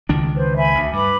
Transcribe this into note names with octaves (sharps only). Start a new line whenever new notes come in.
C#2 D#3 D4
B4 C5
E5 G#5 B5
D2
G2 B4 B5 D6